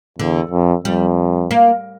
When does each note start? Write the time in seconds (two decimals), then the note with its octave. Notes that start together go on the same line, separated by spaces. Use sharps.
0.19 E2 D3
0.51 F2
0.85 F2 G3
1.51 A#3